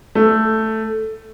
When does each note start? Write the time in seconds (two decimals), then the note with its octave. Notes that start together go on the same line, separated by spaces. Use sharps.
0.15 A3